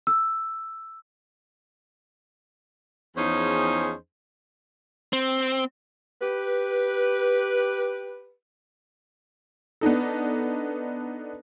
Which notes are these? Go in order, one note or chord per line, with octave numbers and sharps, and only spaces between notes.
E6
E2 F3 C#4 D#4 G#4 C5
C4
G4 B4
B3 D4 D#4 A4